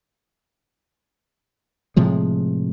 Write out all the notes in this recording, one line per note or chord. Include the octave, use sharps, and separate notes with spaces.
A2 C3 F3 G#3